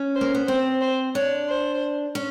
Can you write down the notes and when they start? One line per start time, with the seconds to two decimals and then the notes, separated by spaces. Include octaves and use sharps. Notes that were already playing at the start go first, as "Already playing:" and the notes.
Already playing: C#4
0.15 C5
0.21 A#3
0.35 B3
0.48 C4 C5
0.81 C5
1.15 D4 C#5
1.49 C5
2.15 C#4